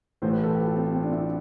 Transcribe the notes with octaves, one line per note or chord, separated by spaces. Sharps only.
A1 A2 E3 C5
B4
A4
G4
F4
C4
C4
D4
E4